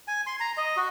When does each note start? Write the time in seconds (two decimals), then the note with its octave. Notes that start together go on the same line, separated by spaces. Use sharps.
0.08 G#5
0.27 C6
0.40 A#5
0.57 D#5
0.77 F#4